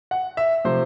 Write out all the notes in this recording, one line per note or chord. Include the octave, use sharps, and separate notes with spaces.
F#5
E5
C3 F3 A3 C5